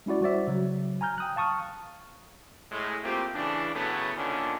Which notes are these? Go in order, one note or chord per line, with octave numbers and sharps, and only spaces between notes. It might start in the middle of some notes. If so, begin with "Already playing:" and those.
G#3 C#4 E4 F#4 D5
G3 F#4 C5 D5 E5
C#3 F#3
G#5 A#5 F6 G6
G5 D#6 F#6
F5 A5 C#6 D#6 F6
A2 G#3
A3 A#3 C4 F4 G4
C#3 E3 D4
A2 C#3 F#3 A3 B3
A#2 D3 D#3 C#4 D4